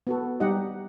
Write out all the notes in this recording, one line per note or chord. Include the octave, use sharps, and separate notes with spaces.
B3 F#4 A4
G3 D#4 G4 D#5 F#5